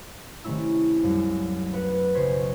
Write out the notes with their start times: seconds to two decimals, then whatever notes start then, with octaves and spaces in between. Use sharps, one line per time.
0.44 C3 D#3 A3 C#4 E4 E6
1.03 C2 F#2
1.74 B4 F#5
2.14 B1 C#3 F#4 C5 G#6 B6